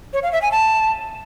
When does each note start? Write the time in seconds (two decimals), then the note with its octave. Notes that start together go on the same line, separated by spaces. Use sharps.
0.13 C#5
0.23 F5
0.32 E5
0.42 G#5
0.52 A5